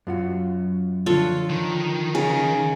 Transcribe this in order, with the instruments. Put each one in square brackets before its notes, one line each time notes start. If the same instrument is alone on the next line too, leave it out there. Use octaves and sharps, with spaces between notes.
[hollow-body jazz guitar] F#2 F4 F#4
[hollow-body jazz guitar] D3 F3 [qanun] F4 A4 C#5
[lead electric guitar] D#3
[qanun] C#3